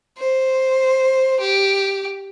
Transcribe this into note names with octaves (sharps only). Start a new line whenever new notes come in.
C5
G4